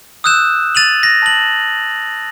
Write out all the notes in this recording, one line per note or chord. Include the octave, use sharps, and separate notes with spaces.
D#6 E6 F#6 G6 E7
A6 D#7 F7 F#7
A#6
A5 F#7